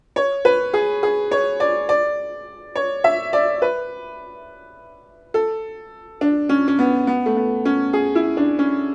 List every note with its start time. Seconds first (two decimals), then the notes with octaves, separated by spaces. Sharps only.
0.16 C#5
0.45 B4
0.74 G#4
1.03 G#4
1.31 C#5
1.60 D5
1.89 D5
2.75 C#5
3.04 E5
3.33 D5
3.62 B4
5.34 A4
6.21 D4
6.49 C#4
6.68 C#4
6.79 B3
7.07 B3
7.26 A3
7.37 B3
7.65 C#4
7.93 G#4
8.15 E4
8.37 D4
8.59 C#4